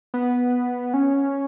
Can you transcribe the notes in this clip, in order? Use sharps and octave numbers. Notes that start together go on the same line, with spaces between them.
B3
C#4